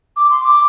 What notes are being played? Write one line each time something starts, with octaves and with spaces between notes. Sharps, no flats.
D6
C6
D6